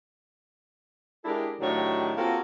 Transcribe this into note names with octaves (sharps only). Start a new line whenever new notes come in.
G#3 D4 E4 G4 A4 A#4
A2 D#3 F#3 D4 G4 C#5
A#3 C4 F4 F#4 G#4 A4